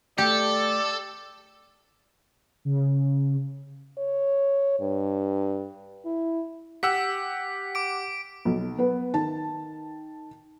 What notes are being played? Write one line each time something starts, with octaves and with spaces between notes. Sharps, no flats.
A3 G4 A4 D5
C#3
C#5
G2
E4
G4 F#5 E6 B6
D6 D7
B1
B3 B4
D#3 A5